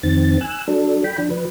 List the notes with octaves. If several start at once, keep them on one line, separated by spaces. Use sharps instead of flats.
F2 D#3 C4 A6
G#5 E6 F#6
F#3 D4 A4
G5 B5
F3 D4
F3 B4